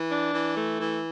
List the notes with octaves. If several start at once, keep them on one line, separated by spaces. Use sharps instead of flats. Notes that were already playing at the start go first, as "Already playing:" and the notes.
Already playing: E3
D4
E3
A3
E3